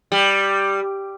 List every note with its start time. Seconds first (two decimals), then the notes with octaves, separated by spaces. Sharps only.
0.12 G3